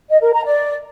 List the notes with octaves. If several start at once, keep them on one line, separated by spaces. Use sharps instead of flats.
D#5
A#4
A#5
D5